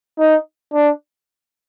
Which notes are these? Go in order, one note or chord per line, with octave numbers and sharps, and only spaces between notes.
D#4
D4